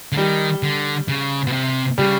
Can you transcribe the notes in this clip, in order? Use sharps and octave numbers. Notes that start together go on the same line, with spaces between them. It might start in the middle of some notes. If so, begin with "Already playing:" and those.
D3
D#3 G3
D3
C#3
B2
C3
C#3 G3